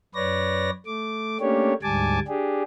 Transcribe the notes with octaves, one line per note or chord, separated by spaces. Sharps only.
F#2 B4 C#5 D5 A#6
A3 D6
A3 A#3 C#4 D4 G4 C#5
D2 G#2 G3 G#5 A5 D6
D4 G4 G#4